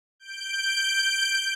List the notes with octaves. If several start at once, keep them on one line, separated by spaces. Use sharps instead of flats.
G6 D7